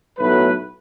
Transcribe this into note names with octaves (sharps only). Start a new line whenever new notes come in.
B1 A2 F#3 A3 B4